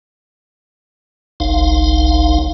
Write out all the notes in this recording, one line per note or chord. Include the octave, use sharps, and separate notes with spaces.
F#1 C2 D#4 F5